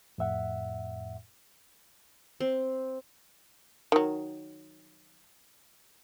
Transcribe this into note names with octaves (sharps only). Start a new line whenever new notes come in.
F2 A2 E5 F#5
C4
D#3 F#3